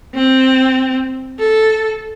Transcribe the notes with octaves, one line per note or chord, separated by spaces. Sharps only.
C4
A4